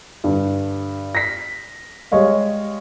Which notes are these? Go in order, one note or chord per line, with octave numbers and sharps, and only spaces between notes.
G2 D3
A#6 B6
G3 G#3 C#5 D#5 F5